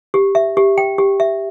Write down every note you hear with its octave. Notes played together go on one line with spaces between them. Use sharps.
G4
E5
G4
G5
G4
E5